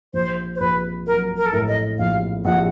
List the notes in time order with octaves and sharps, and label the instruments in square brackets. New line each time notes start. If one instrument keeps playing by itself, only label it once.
[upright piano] A#1 [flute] C5
[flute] C5
[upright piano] A#1 [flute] B4
[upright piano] F#3 [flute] A#4
[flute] A#4
A4
[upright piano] A2 [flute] A#4
[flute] D#5
[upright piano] A#1 [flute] F5
[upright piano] A#1 [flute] F#5